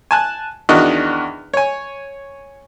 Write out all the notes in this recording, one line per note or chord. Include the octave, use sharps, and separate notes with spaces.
G#5 A5 F#6
E2 D#3 D4 F#4 D#5 F#6
C#5 G#5